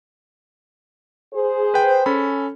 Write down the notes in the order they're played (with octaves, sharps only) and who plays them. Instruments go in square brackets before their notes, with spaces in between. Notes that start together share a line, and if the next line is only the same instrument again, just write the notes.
[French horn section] G#4 C5
[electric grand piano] B4 G5
C#4 A4 B5